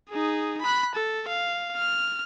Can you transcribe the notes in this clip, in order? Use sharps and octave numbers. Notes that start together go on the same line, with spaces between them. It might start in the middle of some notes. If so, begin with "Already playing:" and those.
D#4 G#4
B5 F#6
A4
F5
F6